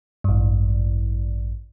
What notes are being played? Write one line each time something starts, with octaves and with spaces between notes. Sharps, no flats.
A1 G2